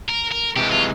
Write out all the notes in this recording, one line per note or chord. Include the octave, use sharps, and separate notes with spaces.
A#4
A#4
C3 E3 G#3 G4
F4